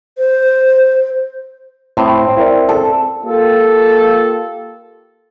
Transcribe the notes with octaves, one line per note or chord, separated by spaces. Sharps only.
C5
A2 C4
E4 A#4 D5
A4
A#3 F4 G4 A4